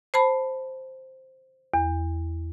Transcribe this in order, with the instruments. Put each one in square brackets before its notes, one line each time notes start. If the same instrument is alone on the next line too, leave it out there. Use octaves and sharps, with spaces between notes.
[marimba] C5 A5 B5
E2